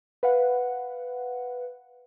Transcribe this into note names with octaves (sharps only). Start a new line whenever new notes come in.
B4 F5 F#5